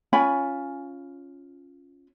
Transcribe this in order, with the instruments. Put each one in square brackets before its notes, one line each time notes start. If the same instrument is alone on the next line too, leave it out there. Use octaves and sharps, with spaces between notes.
[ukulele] C#4 F4 G#5 B5